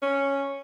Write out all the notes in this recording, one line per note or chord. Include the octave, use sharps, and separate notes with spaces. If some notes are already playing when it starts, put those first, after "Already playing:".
C#4